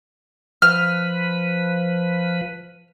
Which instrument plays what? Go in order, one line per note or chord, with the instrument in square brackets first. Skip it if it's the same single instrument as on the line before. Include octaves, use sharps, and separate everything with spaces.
[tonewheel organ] F3 B4 [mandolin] F6